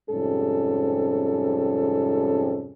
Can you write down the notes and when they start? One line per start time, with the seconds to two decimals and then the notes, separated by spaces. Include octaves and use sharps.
0.11 F2 G#2 C3 G3 C#4 A4